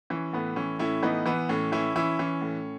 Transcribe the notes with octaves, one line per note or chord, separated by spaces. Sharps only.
E3 C#4
A2 B3
E3 C#4
A2 C#4 E4
E3 B3 D#4
E3 B3
A2 C#4
E3 C#4 E4
E3 C#4 E4
E3 C#4
A2